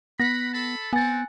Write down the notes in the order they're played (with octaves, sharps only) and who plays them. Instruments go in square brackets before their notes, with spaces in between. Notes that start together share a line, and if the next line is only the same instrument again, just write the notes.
[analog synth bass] B3 [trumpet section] F#5 B5 [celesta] A#6
[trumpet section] A4 A5 B5
[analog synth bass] B3 [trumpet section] C4 F#5 [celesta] G#5 A6